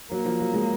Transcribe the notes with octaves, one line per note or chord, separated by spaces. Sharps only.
F#3 A#3
F3
F#3
G#3